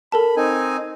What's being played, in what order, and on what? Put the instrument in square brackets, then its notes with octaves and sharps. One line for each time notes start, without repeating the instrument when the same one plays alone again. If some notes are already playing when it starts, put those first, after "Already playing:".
[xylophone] A4 A#4 A5 [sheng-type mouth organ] B5
[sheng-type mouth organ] C4 D#4 G#5